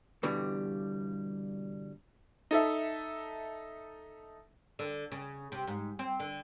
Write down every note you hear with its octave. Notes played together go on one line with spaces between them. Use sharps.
G2 B2 D3 E3 G3
D#4 A4 E5
D3
C#3
C3
G#2
C4
D3